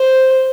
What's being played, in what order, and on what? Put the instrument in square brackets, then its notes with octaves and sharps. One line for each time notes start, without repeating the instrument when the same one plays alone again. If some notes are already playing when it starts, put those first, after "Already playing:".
Already playing: [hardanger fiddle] C5